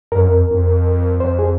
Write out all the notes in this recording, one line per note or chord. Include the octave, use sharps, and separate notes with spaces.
F#2 A#4
F2
F2
F2 C5
G#4